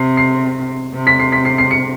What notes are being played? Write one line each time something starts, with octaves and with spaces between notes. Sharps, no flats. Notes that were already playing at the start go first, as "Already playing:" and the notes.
Already playing: C3 C7
C7
C3
B6
C7
B6
C7
C7
C#7